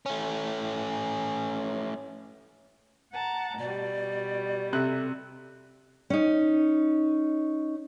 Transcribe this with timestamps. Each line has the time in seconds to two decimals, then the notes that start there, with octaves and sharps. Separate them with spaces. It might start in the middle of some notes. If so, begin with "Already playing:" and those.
0.06 A3 C#4
3.13 F#5 A5 A#5
3.59 B2 G3 D5
4.73 C3 A4 F#6
6.10 C#4 D#4